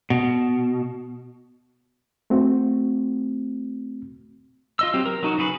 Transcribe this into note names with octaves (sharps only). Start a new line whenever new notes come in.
B2
A3 C4 F#4
F4 D#5 E6
F#3 C4 G4
A#4
F#3 D#4 F#4
C#3 F#4 G#4 B4